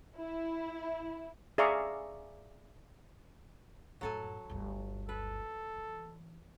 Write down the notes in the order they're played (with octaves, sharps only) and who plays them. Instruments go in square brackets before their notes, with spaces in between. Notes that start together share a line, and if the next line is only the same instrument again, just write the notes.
[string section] E4
[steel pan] G#4 D5 E5 F5 A#5 C#6
[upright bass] F#2 A2 [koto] F#3 A4 G#5
[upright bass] G1 D2
[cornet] A4 [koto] B4
[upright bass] E3